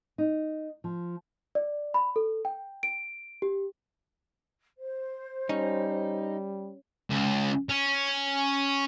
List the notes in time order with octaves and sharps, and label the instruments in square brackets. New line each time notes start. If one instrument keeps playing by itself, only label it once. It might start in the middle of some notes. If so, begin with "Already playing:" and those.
[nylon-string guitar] D#4
F3
[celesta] D5
B5
A4
G5
D7
G4
[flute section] C5
[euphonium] G3 [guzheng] C#4 [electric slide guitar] D#4
[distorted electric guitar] C#2
C#4